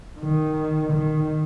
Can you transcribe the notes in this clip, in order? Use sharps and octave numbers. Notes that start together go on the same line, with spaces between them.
D#3
D#3